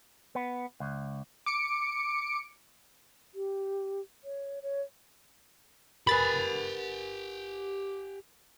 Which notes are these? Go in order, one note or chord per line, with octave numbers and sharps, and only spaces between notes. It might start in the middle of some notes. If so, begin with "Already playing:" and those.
B3
C#2
D6 C#7 D7
G4
C#5
C#5
G4 A#4 B4 G#5 B5 A6